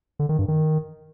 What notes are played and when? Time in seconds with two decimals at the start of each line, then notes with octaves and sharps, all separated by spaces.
0.19 D3
0.29 D#3
0.39 G2
0.48 D#3